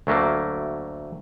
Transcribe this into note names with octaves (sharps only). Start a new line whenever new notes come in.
D2 F#3 A3 A#3